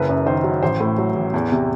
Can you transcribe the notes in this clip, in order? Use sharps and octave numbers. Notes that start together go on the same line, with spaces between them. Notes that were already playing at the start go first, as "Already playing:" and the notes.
Already playing: F#1 B4
F#2
D#3 C5
F#3
A1 C5
A2
F#3
A1
E2
C3